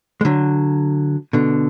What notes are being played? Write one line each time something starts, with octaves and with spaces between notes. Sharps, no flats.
G#3
D3 F#3
B2 D3